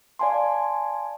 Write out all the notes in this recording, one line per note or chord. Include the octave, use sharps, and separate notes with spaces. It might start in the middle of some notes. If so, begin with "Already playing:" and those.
D5 F5 G#5 A5 C6